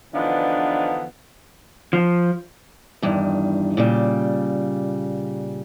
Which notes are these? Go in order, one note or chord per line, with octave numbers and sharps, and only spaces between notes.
D3 E3 F3 B3 D4 D#4
F3
E2 G2 D#3
A#2 C#3 G3